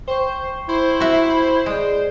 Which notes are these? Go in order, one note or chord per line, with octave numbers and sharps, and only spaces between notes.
C5 G5 C#6
E4 C5
F#4 E5
G#3 G#4 D5